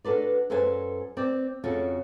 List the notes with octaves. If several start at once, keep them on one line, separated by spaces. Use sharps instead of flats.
D4 F#4 A4 B4 D5
F#2 A4 B4 C5 G#5
C4 D5
F2 C#3 F#4 A4